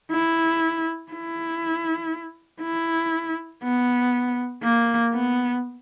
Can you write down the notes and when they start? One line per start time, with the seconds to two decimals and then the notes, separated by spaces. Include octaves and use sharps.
0.12 E4
1.12 E4
2.62 E4
3.63 B3
4.63 A#3
5.14 B3